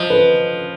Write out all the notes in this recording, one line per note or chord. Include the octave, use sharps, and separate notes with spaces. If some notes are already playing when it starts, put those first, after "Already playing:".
Already playing: F3 D#5
B4